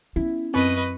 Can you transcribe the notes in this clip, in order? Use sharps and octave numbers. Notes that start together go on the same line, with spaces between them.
B3 C#4 E4
F#2 C4 B4 D#5 B5 C#6